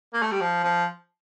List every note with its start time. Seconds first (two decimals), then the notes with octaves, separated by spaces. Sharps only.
0.14 A#3
0.22 A3
0.32 G3
0.41 F3
0.64 F3